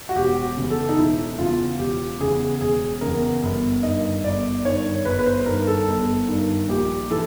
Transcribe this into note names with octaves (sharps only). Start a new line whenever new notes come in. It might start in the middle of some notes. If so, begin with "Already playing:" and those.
F#4
E1 G4
E2 C#3
A4
D#4
E1 E4
E2 C#3 F4
E1 G4
E2 C#3 G#4
E1 G#4
E2 C#3 A#4
G1
G2 D#3 D#5
G1 D5
G2 D#3 C#5
G1 B4
B4
C5
G2 D#3 A#4
A4
G1
G2 D#3
A#1 G4
E3 A4